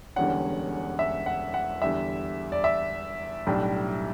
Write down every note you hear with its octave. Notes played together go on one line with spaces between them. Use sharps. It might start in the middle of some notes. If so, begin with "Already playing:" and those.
E1 E2 D3 G3 C#4 F#5
E5
F#5
F#5
E2 D3 G3 E5
D5
E5
B1 A2 G3 D4